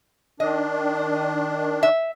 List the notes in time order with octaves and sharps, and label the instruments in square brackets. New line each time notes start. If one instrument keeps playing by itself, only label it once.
[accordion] D#3 D4 [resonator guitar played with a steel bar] D#5
[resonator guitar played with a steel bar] E5